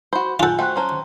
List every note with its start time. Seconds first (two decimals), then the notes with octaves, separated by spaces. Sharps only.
0.13 F#4 C5 B5
0.40 F4 A4 D5 F#5 G#5 F#6 G6
0.59 A3 F#4 C5 G5 C6 F#6
0.76 F#3 C#4 C5 A5 A#5 C6